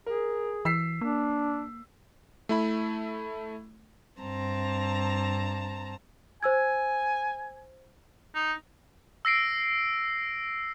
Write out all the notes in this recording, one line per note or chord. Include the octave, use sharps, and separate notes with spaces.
G#4 A#4
E3 E6 B6 C7
A#3 D4
A3 E4 B5
G2 C4 A5 A#5
C5 G#5 E6 G#6
D#4
E6 A#6 C7 D7